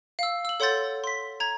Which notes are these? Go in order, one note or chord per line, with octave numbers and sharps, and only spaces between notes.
F5 E6
E6 F#7
A4 C#5 F#5 C6 G6 A6
C6 B6
A#5 G#6